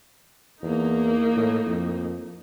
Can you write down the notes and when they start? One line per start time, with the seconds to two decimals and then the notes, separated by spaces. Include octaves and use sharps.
0.62 E2 A#3 D#4
1.36 A2
1.66 F2